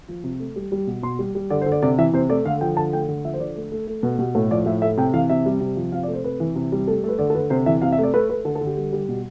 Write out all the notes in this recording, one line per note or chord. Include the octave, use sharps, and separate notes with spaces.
F3
C3
A3
G3
G3
B2
B2 C6
G3
G3
D3 D5
C5
D3
D5
C3 D5
E3 E5
C3 C5
A3 D5
D3 F5
F3 G5
D3 A5
A3 G5
D3
F3 E5
C5
D3 D5
A3
A3
A3
B2 B4
B2 G4
A2 A4
F3 D5
A2 E5
A3 E5
C3 G5
E3 F5
C3 E5
G3
C3
F3
C3 F5
D5
A3
C5
C3 B4
E3
C3
G3
A3 A4
A3 B4
D3 D5
A4
D3 B4
C3 C5
E3 E5
C3 F5
E5
A3 D5
A3 B4
A3 B4
D3 A4
A4
D3
G4
G3
G3
B2